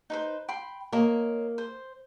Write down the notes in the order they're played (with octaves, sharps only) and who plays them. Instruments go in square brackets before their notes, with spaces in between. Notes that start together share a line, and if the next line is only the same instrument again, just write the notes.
[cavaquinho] D#4 B4 C5
G5 B5 C6
[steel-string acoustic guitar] A#3 [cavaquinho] A#4 C#5 D#5
[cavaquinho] C5